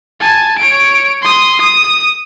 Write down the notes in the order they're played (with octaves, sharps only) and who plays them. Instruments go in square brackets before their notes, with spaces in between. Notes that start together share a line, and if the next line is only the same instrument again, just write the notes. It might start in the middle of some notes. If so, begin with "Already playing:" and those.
[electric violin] G#5 A5
C#5 D7
C6 D#6
D#6